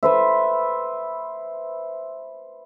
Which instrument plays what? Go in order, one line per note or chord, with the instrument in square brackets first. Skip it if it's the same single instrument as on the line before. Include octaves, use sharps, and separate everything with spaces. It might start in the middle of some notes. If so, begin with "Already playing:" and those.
[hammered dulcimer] B4 C5 E5